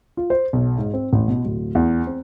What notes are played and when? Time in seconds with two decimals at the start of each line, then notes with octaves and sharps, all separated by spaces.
0.17 F4
0.30 C5
0.53 B1
0.78 G#2
0.94 C4
1.13 A1
1.28 B2
1.45 D1
1.75 E2
2.07 C4